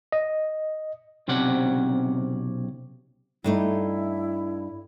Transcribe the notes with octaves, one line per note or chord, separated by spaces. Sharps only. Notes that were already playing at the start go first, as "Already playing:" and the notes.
D#5
B1 C3 C4 C#4 D5 F#5
G2 A3 D#4 E4